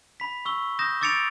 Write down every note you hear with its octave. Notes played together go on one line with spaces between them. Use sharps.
B5 B6
C#6 E6 G7
D#6 G6 A#6 E7
D6 E6 A6 C#7 D7 F7